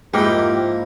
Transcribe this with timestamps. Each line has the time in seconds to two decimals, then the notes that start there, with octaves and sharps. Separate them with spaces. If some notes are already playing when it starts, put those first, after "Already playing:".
0.14 G#2 F3 A#3 E4 G4 A#4 D#5 G5